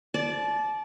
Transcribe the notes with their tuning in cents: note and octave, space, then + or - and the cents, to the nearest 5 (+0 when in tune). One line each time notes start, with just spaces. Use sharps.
D5 +0 A5 -35